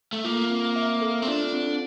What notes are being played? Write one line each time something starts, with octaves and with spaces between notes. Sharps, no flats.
A3
A#3 F4
C4
E5
A4
C4
D4 F4
C4